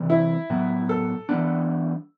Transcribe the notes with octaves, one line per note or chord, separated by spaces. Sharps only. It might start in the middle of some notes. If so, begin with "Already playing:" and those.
Already playing: C3 E3 G3 C4
E4
A2 F#3 B3
A4
E3 G3 B3 D4